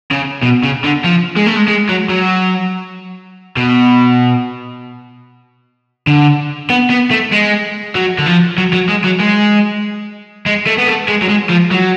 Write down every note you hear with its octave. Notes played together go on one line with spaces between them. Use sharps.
C#3
B2
C#3
D3
F3
G#3
A3
G#3
G#3
F#3
F#3
B2
D3
B3
B3
A3
G#3
F#3
D3
F3
F#3
F#3
G#3
F#3
G#3
G#3
A3
B3
A3
G#3
F#3
G#3
F3
F#3